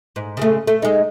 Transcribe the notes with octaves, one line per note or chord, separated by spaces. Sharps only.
G#2
C#3 G#3 A3
A3
G#3 D#4